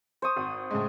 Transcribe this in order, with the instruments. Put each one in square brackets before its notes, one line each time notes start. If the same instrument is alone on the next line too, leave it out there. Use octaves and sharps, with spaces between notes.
[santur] C5 C#6 D#6
[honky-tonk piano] G#1
A2 C#3 G#3